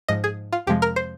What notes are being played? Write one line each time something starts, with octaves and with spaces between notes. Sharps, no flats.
G#2 F3 G#3 D#5
G#4
F4
F2 C3 F3 G#3 G4
A#4
C5